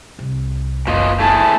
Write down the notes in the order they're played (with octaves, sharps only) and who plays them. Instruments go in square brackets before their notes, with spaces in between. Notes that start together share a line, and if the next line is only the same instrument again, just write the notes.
[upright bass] C2
[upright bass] F#1 B1 [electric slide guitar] B2 F4 D#5
[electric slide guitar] A3 E4 G#4 [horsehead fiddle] A5